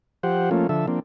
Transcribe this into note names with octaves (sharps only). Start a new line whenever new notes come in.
F3 G4 C5 F#5
F3 A3 A#3 C#4 F4
D3 F3 A4 E5
F3 A#3 C4 D4